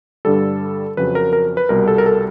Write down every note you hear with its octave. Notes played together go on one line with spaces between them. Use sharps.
G2 D3 G3 A4
F2 C#3 F#3 B4
A#4
A#4
B4
C2 B2 G3 A#4
A4
A#4
A4